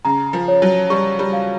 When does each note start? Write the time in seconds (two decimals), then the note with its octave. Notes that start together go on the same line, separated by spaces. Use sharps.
0.05 C#3 A#5
0.33 F3
0.48 C#5
0.62 F#3
0.90 G3 C#6
1.19 G3
1.33 F5